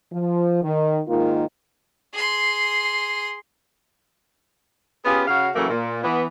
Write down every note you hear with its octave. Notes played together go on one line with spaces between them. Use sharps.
F3
D#3
G#2 D#3 A#3 D#4 F4
G#4 C6
B3 C#4 F4 G4 G#4 B4
C#3 F#4 F5
A2 C#3 E3 F#3 A3 A#3
A#2
E3 B3